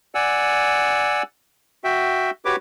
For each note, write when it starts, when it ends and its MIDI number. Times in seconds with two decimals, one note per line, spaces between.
0.15 1.22 74
0.15 1.22 78
0.15 1.22 80
0.15 1.22 88
1.84 2.31 66
1.84 2.31 76
1.84 2.31 79
2.45 2.56 66
2.45 2.56 67
2.45 2.56 71
2.45 2.56 73
2.45 2.56 86